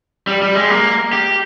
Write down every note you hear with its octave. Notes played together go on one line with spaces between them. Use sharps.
G3
G3
G#3
A#3
G4